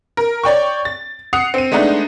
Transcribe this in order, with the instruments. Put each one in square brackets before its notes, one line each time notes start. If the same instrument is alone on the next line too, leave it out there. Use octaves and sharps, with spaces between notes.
[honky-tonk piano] A#4
C#5 D5 G5 C#6
A6
F#5 D#6 C7 C#7 F7
C4 D#7
G#3 A3 B3 D4 D#4